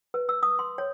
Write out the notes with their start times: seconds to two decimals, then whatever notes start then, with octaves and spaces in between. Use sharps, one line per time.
0.14 B4
0.29 E6
0.43 D#6
0.59 C6
0.78 C#5